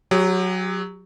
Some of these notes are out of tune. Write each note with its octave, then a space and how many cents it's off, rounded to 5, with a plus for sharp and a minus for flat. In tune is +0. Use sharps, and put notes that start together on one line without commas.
F#3 +0 G4 +40